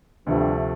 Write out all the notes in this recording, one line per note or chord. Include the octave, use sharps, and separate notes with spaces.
D2 G2 C3 F3 A3